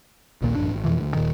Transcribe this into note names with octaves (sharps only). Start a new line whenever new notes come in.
A#1 D#2 A#2
A1 F#2 D4
G#1
F2 B2 E3 F3
D2
D#1 A#2 D#3